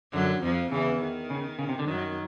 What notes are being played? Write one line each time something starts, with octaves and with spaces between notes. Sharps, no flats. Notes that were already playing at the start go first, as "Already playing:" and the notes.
F#2 D3 F#3
F2 F3
E2 C#3 E3
D#3
C#3
C#3
C3
D3
F#2 D#3 F#3